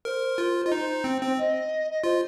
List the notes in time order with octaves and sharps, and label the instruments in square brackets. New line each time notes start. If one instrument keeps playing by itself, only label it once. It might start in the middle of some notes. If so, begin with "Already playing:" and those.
[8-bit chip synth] A#4 [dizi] C5
[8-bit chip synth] F4
[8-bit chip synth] F4 [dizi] D#5
[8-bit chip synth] D#4 [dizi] C5
[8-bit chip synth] C4
C4
[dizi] D#5
D#5
[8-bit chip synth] F4 [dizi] C5